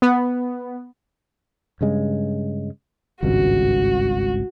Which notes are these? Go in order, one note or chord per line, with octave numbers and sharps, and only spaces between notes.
B3
G2 C#3 G#3
G#1 C#2 G2 F#4